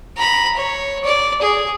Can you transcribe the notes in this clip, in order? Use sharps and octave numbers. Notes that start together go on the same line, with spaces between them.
A#5 B5
C#5
D5
G#4